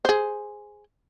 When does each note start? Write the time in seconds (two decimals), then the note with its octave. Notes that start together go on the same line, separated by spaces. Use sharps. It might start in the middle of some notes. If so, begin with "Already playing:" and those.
0.05 G#4 C5